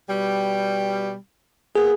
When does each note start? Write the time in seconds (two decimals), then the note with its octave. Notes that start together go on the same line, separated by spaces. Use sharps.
0.09 B2 G3
1.76 A#3 B3 G#4